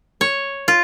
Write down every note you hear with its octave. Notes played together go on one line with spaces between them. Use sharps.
C#5
F4